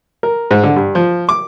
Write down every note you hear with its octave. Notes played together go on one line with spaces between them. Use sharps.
A#4
G#2
D3
G2
F3
D6